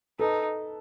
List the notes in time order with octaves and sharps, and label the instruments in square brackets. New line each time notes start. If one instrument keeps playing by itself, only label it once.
[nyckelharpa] D#4 [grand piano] A4 B4